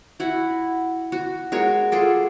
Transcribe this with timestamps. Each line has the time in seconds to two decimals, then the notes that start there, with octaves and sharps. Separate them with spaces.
0.20 E4 F#4 F#5
1.12 F#4
1.52 G#3 F#4 A#4 C#5
1.92 F4 G#4 A4 D5